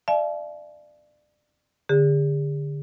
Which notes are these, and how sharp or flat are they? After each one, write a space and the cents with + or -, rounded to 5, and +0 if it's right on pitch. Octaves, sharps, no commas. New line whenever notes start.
D5 +25 F5 -45 A5 -45
D3 -15 G#4 -40